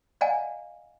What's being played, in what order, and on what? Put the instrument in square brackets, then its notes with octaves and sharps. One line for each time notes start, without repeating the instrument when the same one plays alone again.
[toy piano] D5 D#5 F5 F#5 G#5 A#5